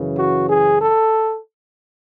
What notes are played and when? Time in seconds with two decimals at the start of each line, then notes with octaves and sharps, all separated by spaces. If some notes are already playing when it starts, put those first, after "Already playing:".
Already playing: F#2 C#3 E3
0.18 F#4
0.49 G#4
0.79 A4